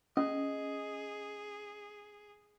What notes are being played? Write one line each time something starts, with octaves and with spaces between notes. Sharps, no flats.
C#4 G#4 D#5